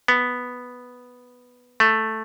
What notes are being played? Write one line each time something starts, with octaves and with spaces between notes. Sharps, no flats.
B3
A3